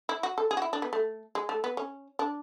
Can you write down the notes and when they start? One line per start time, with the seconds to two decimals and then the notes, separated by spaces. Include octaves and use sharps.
0.09 E4
0.23 F#4
0.38 A4
0.51 G#4
0.57 F#4
0.62 E4
0.73 D4
0.82 B3
0.93 A3
1.35 G#3
1.49 A3
1.64 B3
1.77 C#4
2.19 D4